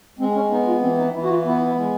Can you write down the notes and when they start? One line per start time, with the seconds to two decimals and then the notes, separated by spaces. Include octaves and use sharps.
0.19 G#3 C4
0.35 C#4
0.51 B3 D#4
0.67 F4
0.82 E3 C4
0.98 D#4
1.14 E3 E4
1.24 F#4
1.30 F4
1.45 B3 E4
1.67 E4
1.78 G#3